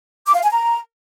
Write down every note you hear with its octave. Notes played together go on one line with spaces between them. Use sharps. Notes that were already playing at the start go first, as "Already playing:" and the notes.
D6
F5
G#5
A#5